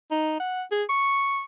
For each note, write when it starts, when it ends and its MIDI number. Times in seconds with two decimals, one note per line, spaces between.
0.11 0.36 63
0.40 0.63 78
0.71 0.83 68
0.89 1.42 85